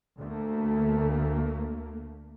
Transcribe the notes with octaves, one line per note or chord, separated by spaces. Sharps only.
D2 A3 A#3